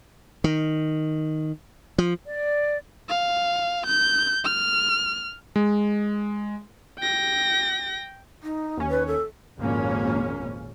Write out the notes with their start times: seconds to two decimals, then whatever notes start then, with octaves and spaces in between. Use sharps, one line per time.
0.44 D#3
1.98 F3
2.26 D5
3.09 F5
3.86 G6
4.45 F6
5.56 G#3
6.99 G5 A#6
8.43 D#4
8.77 D#2 C#4
8.90 B4
9.07 A4
9.57 G#1 F2 A#2 A#3 C#4